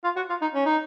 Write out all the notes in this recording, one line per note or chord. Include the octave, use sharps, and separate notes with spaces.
F4
F#4
F4
D#4
C#4
D#4